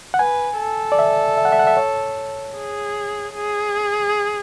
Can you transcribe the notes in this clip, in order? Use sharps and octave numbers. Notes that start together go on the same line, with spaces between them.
F#5
B4 G#5
A4
D5
E5
E5
F#5
E5
F#5
E5
C#5
G#4
G#4